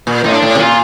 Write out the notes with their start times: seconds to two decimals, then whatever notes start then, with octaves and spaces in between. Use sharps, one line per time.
0.07 A#2
0.24 A2 D#4
0.33 D4
0.42 A2
0.55 C3
0.59 A#2 F4